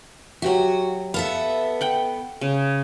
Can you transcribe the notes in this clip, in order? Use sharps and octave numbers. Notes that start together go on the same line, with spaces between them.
F#3 F#4 G4 E5
B3 A4 E5 F5
F#5 G5
C#3